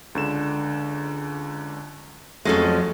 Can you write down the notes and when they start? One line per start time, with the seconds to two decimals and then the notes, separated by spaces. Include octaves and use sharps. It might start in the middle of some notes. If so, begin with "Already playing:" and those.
0.15 C#2 D3 E7
2.45 F2 F3 F#3 G#3 A3 C#4 A4